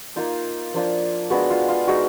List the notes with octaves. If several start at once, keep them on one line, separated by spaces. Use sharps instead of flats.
A#3 D#4 F4
F3 A#3 D4 F4
G#3 B3 D4 F#4
F4
F4
G#3 D#4 F#4